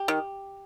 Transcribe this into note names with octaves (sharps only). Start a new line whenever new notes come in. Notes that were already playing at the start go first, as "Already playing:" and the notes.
Already playing: G4
D#3